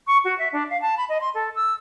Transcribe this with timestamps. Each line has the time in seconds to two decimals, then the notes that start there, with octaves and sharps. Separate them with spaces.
0.07 C#6
0.24 F#4
0.38 E5
0.52 D4
0.70 F5
0.82 A5
0.97 B5
1.09 D#5
1.21 C6
1.34 A4
1.55 E6